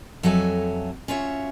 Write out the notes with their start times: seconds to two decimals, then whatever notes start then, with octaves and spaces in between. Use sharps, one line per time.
0.23 F2 F#3 A4 C#5 E5 G#5
1.08 C#4 F4 F#4 C#5 E5